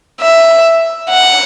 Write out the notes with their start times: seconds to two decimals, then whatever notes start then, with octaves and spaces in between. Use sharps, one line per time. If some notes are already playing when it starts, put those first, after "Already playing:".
0.21 E5
1.10 F#5